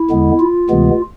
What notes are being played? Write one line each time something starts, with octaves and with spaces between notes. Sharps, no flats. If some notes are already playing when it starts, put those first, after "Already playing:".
Already playing: E4
E2 D3 G#3 B3
F4
D2 C3 E3 G#3 B3